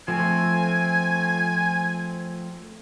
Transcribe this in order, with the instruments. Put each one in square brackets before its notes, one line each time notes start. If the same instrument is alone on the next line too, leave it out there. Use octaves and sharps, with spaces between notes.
[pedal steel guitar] F3 A3 C4 [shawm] G#5